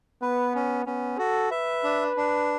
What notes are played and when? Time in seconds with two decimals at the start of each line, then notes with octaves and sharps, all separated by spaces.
0.22 B3 B4
0.55 C#4
0.86 B3 C#4
1.18 F#4 A4
1.51 B4 E5
1.83 D4
2.17 D4